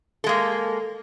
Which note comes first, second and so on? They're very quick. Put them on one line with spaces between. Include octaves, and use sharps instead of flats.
A4 G#3 A#3